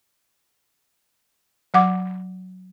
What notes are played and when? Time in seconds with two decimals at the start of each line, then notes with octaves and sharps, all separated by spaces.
1.74 F#3 F#5 D6